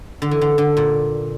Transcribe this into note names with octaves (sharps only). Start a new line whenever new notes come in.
D3
E3
D3
D3
A#2